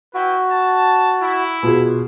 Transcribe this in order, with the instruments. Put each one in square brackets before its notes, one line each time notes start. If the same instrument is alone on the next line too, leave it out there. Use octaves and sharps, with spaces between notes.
[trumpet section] E4 B4 G5 [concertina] F#4
[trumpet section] A5
E4
[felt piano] B2 F4 G#4